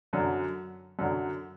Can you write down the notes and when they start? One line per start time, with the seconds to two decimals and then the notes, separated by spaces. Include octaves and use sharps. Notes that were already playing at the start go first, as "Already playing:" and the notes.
0.13 F#2 D3 F#3
0.99 F#2 D3 F#3